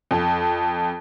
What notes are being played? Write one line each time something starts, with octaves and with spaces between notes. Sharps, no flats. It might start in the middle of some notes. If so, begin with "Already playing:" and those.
F2